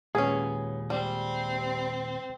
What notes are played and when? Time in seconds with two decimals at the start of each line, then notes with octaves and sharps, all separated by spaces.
0.15 D#2 A#2 G#3 B3 C#4 G#4
0.90 G3 C4